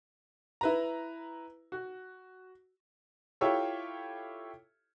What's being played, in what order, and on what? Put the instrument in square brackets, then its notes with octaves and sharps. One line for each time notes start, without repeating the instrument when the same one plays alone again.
[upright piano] E4 B4 A#5
F#4
E4 F4 G4 A4 C#5 E5